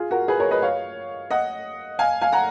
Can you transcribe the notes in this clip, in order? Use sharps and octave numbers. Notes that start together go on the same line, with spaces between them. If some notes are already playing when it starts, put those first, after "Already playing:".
Already playing: F4 G#4
F#4 A#4
G#4 B4
A#4 C#5
B4 D#5
C#5 F5
D#5 F#5
F5 G#5
F5 G#5
F#5 A#5